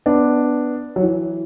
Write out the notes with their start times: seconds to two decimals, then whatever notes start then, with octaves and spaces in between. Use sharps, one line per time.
0.06 B3 D4
0.96 F#3
1.02 E3